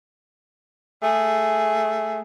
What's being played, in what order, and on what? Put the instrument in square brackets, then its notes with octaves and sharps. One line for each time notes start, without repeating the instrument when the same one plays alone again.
[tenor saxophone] A3 [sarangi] G#4